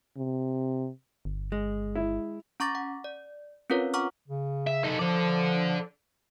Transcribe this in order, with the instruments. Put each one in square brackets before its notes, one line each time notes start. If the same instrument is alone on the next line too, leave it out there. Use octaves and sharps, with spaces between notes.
[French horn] C3
[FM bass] G1
[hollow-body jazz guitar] G#3
[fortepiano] E4
[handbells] C#4 A#5 C#6 D6 A6 A#6
F#5
D5
C4 C#4 F4 A#4 B4 C#5
F#5 A#5 C#6 D6 F6
[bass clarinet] C#3
[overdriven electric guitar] E5
D#4 A4
[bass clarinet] F3 [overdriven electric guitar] A4 D5